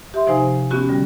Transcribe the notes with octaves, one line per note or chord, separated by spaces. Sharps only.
G4 E5 C6
C3 F3 D#4 C5 G#5
B3 C#4 F#4 G4
D3 G3